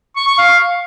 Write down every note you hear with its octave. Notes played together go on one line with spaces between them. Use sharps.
C#6
C#6
F5